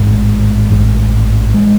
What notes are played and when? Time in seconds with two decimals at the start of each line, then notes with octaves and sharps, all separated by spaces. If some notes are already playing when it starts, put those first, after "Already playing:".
Already playing: A1 G#2 G#3
0.70 A1 G#2
1.54 G#3